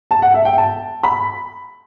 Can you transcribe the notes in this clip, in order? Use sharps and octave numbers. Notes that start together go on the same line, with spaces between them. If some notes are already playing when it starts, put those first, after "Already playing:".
A5
F#5
E5
G5
A5
B5